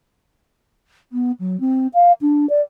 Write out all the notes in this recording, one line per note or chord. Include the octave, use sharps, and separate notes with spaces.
B3
F#3
C4
F5
D4
D5